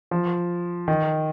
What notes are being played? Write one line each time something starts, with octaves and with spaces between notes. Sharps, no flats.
F3
D#3